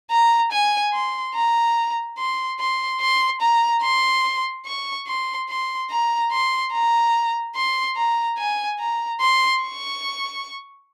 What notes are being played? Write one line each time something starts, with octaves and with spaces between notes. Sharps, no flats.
A#5
G#5
C6
A#5
C6
C6
C6
A#5
C6
C#6
C6
C6
A#5
C6
A#5
C6
A#5
G#5
A#5
C6
C#6